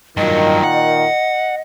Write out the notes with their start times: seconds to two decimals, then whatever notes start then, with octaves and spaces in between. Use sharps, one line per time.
0.17 G2 A#2 D#3 F#3 D#5
0.64 F#5